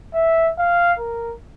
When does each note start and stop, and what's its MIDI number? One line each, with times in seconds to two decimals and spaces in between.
0.14 0.50 76
0.58 0.93 77
0.99 1.34 70